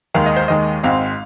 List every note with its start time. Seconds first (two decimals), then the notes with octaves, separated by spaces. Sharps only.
0.14 D#2 D#3 G#3 F5
0.26 D#5
0.36 C5
0.48 D#2 D#3 G#3 D#5
0.83 G#1 G#2 G#3 C4 F5